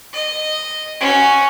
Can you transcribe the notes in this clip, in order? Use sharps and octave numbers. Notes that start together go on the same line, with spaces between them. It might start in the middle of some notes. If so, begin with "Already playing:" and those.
D#5
C#4 F#4